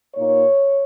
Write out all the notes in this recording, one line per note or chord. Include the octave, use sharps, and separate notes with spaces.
A#2 A#3 D#4 C#5